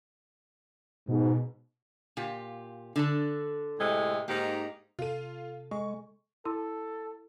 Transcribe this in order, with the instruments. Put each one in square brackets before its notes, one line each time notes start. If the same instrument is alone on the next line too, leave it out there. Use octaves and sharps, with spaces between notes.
[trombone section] G#2 [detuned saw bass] B2
[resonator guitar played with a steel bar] A#2 F4 G4
D3 D4 A4
[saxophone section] A2 C3 G#3
[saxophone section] G#2 D#4 G4 [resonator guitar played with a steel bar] A#3
[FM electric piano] C3 A4 [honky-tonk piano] F4 D#7
[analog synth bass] G#3 [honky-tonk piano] C#6
[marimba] E4 C6 E6 [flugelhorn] A4